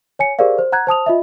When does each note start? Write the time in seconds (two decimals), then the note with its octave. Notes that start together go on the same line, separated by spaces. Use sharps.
0.19 C#5 G#5 C#7
0.39 G4 G#4 A#4 C5 D5 F5
0.59 C5
0.72 F#5 A#5 F#6 G#6
0.87 C5 A5 D#6 F7
1.06 F4 D#5 E5